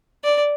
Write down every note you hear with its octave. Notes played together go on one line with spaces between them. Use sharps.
D5